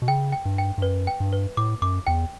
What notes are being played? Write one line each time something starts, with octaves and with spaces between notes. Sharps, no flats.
B2
C#3 G5
G5
G2
G5
G2
F#2 B4
G5
G2
B4
A2 D6
F#2 D6
E2 G5